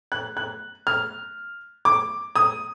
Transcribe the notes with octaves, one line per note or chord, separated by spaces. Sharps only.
F#6
F#6
F6
D6
D#6